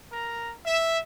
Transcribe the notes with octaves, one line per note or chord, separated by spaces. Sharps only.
A#4 A#5
E5